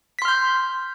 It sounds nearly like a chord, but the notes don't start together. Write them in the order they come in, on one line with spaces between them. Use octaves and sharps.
B6 C6 F6 G6